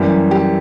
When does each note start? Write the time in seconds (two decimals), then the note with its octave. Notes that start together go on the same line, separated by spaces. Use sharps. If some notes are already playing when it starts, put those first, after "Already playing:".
Already playing: F#2 E3 G3 G4
0.31 G4